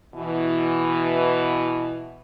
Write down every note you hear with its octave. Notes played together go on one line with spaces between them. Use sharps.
B2 E3